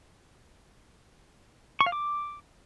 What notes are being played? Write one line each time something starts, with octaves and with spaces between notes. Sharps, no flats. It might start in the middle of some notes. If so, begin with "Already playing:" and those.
C#6
F5
D6